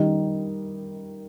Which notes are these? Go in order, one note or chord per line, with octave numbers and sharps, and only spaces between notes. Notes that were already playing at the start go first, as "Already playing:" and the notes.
Already playing: D#3 G3 D#4